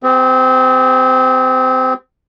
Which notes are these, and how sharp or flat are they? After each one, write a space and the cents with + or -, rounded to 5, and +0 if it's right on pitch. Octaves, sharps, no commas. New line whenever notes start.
C4 -25 G4 +40